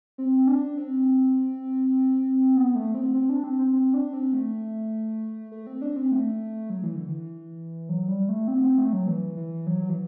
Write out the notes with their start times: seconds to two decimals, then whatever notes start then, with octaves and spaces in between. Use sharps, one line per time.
0.18 C4
0.47 D4
0.78 C4
2.56 B3
2.75 A3
2.95 C4
3.14 C4
3.29 D4
3.44 C4
3.59 C4
3.73 C4
3.94 D4
4.13 C4
4.33 A3
5.52 A3
5.67 C4
5.82 D4
5.96 C4
6.12 A3
6.70 F#3
6.83 E3
6.95 D3
7.08 E3
7.89 F#3
8.08 G3
8.29 A3
8.48 C4
8.63 C4
8.78 A3
8.93 F#3
9.07 E3
9.37 E3
9.67 F#3
9.82 F#3
9.89 E3